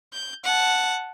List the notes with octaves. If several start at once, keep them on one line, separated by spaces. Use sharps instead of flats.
G6
F#5 A5